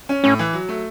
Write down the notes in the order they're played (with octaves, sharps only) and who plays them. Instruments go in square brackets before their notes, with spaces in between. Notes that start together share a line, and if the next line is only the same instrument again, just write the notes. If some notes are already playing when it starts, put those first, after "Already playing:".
[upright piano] C#4
[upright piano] A2 [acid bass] C#4
[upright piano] E3
F#3
A3